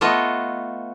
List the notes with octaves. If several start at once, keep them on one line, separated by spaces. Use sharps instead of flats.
A3 B3 F4 F#4 D#5